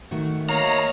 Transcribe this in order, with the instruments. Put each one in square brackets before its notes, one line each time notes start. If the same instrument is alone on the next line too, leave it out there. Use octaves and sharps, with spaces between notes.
[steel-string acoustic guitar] D#3 A3 F#4
[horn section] A#3 D#5 F5 [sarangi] C#5 [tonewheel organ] A#5